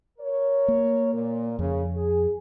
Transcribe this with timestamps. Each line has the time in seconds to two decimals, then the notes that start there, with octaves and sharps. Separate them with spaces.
0.19 A#4 C#5
0.68 A#3
1.13 A#2
1.59 F2 C#3
1.96 G#4